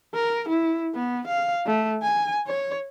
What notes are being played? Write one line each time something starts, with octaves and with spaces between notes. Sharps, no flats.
A#4
E4
B3
F5
A3
G#5
C#5